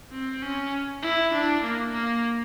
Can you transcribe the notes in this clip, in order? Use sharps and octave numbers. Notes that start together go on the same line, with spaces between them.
C4
C#4
E4
D4
A#3
A#3